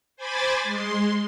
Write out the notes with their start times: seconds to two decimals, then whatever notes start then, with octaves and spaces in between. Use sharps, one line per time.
0.17 C5 G#5 B5 D6 A6
0.63 G#3 C6